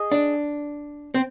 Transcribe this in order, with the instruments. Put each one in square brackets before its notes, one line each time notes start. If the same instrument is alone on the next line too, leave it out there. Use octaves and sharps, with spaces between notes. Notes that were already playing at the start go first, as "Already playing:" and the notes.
Already playing: [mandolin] G#4 D#5
[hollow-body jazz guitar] D4
C4